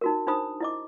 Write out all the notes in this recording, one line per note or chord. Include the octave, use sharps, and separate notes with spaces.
D#4 F#4 A#4
D4 D#4 C5 B5 D#6
E4 D#5 D6